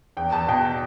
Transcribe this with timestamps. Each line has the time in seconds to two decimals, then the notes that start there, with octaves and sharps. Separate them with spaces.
0.17 E2 G5
0.32 E2 A5
0.48 B2 G5